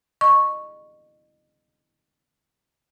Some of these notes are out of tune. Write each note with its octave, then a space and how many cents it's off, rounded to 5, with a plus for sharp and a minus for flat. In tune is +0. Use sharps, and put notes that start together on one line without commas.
D#5 -30 C#6 -5